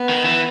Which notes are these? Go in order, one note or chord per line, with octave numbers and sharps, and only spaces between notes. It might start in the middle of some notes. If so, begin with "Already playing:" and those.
Already playing: B3
D#3
E3